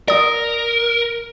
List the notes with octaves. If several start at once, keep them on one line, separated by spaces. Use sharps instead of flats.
A#4 D5 D#6